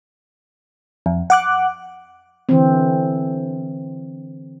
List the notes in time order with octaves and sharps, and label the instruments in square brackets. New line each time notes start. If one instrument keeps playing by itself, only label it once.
[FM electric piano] F2
F#5 D6 F#6
[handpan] D3 E3 C4